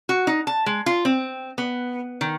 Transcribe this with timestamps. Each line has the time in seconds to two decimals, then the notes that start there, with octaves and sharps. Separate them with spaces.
0.09 F#4
0.27 D#4
0.47 A5
0.66 G#3
0.86 F4
1.05 C4
1.58 B3
2.21 D#3